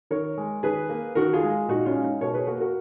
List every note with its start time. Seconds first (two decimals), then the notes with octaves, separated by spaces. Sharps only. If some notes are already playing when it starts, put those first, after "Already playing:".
0.11 D#3 A#4 C#5
0.38 G#3
0.63 D#3 G#4 B4
0.90 A#3
1.15 D#3 F#4 A#4
1.33 F4 G#4
1.43 G#3
1.68 A#2 D#4 F#4
1.86 C#4 F4
1.95 G#3
2.04 D#4
2.21 B2 A#4 C#5
2.34 G#4 B4
2.47 A#3 F#4 A#4
2.60 F#4 A#4